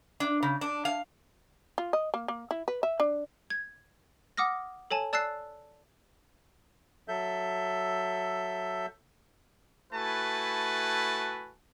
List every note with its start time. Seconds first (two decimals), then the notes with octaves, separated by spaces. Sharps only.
0.20 D4
0.43 C#3
0.61 D4
0.85 F5
1.78 F4
1.93 D#5
2.14 A#3
2.28 A#3
2.51 E4
2.68 B4
2.83 E5
3.00 D4
3.50 G#6
4.37 F#5 D6 D#6 F6 A#6
4.91 A4 C#5 G#5 A5
5.13 D5 A5 E6 F#6 A6 C7
7.08 F#3 A4 E5 G6
9.93 A3 E4 F#4 B4 G#5 A5